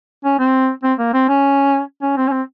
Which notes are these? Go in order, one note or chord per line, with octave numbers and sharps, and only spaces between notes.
C#4
C4
C4
A#3
C4
C#4
C#4
C4
C#4
C4